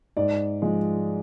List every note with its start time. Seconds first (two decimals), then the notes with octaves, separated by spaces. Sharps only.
0.17 G#2 D5
0.62 F3 G#3